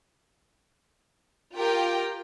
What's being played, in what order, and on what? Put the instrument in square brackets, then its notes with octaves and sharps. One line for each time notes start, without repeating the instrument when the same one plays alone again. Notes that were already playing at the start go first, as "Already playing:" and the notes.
[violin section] F4 G4 A#4 G5